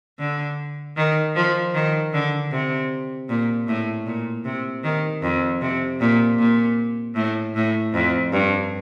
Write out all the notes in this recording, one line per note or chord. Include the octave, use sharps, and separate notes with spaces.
D3
D#3
F3
D#3
D3
C3
A#2
A2
A#2
C3
D#3
F2
C3
A#2
A#2
A2
A2
F2
G2